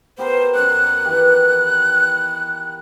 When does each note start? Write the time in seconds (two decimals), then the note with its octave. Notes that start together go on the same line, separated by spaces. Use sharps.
0.18 B3 G4 A#4 C5
0.55 F#2 D5 F#6
1.05 D#3 E3 G4